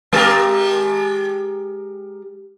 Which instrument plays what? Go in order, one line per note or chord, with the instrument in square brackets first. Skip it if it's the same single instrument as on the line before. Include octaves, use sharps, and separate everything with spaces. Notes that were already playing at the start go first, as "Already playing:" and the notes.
[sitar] G#3 G4 A#4